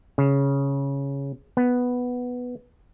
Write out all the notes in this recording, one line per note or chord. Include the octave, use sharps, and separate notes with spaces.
C#3
B3